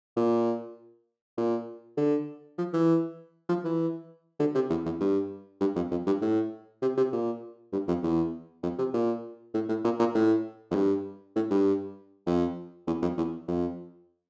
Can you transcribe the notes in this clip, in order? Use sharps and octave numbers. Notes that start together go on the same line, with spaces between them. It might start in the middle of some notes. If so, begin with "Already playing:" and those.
A#2
A#2
D3
F3
E3
F3
E3
D3
C3
E2
E2
G2
G2
F2
F2
G2
A2
C3
C3
A#2
G2
F2
E2
F2
C3
A#2
A2
A2
A#2
A#2
A2
F2
G2
A2
G2
F2
E2
F2
E2
F2